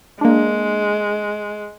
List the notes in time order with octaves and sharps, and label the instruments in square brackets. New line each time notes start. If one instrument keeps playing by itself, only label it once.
[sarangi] G#3 [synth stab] A#3 D4